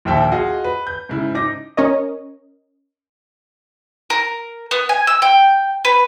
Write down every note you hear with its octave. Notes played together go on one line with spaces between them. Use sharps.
A#1 D#2 E5 G5 A5
F4 F#4 G#4 D#5 F#5
B4
G6
G#2 C#3 E4
D#4 D6 A#6
C#4 A#4 C#5 D#5
A#4
B3
G#5
E6
G5
B4